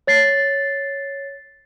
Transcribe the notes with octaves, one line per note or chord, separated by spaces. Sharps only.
C#5 A6 C7